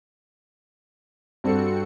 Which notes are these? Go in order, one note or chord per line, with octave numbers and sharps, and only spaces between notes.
G2 C4 F#4 A4 C#7